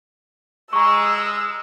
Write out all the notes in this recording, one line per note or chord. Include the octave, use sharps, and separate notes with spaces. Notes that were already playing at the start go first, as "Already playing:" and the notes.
G#3 A#5 C#6 E6